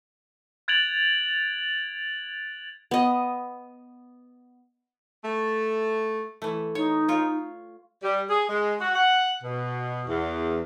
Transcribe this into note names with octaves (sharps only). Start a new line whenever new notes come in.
F#6 G#6 A6 D7 F7 F#7
B3 D#5
A3
E3 A3
D#4 C#5
F4 C#5
G3
G#4
G#3
F#4
F#5
B2
E2